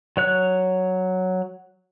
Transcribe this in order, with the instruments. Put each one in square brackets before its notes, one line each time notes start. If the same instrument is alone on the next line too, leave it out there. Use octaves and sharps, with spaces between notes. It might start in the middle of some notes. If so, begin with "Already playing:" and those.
[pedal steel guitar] F#3 C#5 F#6